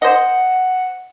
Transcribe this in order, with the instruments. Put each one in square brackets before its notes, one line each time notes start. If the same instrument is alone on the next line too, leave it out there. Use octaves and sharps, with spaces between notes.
[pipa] C5 D#5 [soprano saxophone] F#5